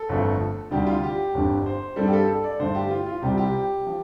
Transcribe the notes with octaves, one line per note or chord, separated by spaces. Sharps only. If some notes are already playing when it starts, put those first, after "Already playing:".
Already playing: A4
G1 F2 F3 A3
D2 C3 G3 G4
F4
G4
G1 F2 D3
C5
G2 G3 C4 A4
G4
A4
A4
D5
G2 D3 A3 C5
G4
F4
F4
C2 C3 G3 C4 G4
G4
F3